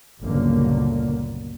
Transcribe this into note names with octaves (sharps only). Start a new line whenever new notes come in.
G1 C#2 A#2 D3 F#3 A#3